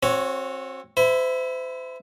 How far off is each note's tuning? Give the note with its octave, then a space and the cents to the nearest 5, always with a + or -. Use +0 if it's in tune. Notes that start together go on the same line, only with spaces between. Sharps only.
C4 +20 F#4 -20 C#5 +0
E4 +0 C5 -35